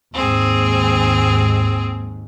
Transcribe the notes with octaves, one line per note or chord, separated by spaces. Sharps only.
D#2 G#2 C4 G#4